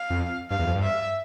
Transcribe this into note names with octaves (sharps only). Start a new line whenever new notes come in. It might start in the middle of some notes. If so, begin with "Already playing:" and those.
Already playing: F5
F2
G2 F5
E2
F2
G2
E5